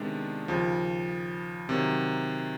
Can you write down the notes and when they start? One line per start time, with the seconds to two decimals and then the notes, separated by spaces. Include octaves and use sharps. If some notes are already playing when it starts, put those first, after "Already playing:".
Already playing: C3 D#3 G#3 B3 D4
0.48 D#2 C#3 F3
1.69 C3 D#3 F#3